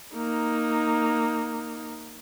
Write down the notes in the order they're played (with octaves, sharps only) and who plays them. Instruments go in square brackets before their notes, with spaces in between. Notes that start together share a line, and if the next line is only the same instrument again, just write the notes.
[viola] A#3 D#4